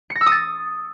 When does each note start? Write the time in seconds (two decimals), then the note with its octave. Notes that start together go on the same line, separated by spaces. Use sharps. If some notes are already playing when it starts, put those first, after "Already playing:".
0.10 C#7
0.15 A#6
0.21 E6
0.26 D#6
0.32 A6